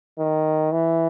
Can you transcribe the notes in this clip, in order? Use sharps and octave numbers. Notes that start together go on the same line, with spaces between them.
D#3
E3